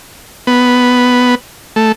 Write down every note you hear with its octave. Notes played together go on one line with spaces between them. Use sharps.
B3
A3